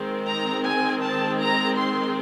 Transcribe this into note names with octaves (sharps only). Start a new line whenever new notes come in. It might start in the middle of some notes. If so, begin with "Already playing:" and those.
Already playing: D#3 G#3 C4
A#5
G#5
A5
A#5
C6